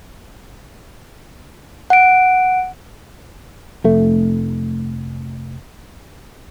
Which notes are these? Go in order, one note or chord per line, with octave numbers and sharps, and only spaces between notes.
F#5 D7
F1 A3